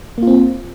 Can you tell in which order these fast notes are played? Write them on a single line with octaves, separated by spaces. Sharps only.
A#3 F4 C4